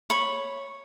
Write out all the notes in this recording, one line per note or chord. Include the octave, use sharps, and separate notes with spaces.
C#5 B5